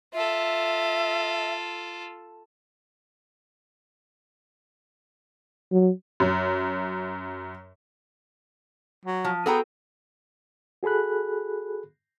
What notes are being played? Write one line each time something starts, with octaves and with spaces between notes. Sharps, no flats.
F4 A4 E5
F#3
F#2
F#3
F3
B3 F#4 G#4 A4 G5 A#5
F#4 G#4 A4 B5 F#6